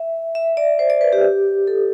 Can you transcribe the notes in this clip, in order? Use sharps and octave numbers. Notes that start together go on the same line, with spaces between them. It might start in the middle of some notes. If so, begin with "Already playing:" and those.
Already playing: E5
E5
D5
C5
D5
B4
G4
A4